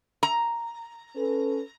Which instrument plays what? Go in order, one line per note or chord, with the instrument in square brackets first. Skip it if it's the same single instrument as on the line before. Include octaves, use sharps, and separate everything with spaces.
[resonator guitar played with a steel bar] A#5
[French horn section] C#4 A4 B4